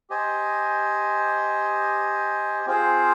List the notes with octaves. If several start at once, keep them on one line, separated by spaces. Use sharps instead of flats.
G4 C5 D#5 G#5
C4 F4 G#4 C5